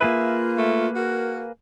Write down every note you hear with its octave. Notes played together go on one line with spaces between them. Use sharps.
A#3 F4 G#4 B4 E5
A3
F#4 A#4